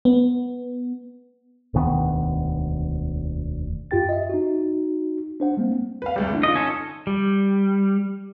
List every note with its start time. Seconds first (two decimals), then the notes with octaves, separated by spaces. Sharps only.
0.05 B3
1.74 E1 D2 D#3 B3
3.91 F#2 F4 G4 G5 A6
4.09 D#5 E5
4.29 D#4 F#4
5.40 D4 C5 F#5
5.57 G3 G#3 A#3 C4
6.02 B4 F5
6.16 G#1 D2 G3
6.31 D3 E3
6.43 D#4 F4 D#5
6.55 C#4 A4
7.07 G3